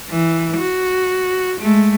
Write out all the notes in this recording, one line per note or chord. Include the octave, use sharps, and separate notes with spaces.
E3
F#4
G#3 A3